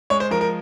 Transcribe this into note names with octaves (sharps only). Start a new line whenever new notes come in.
G#3 C#5
C5
F3 A#4
A#4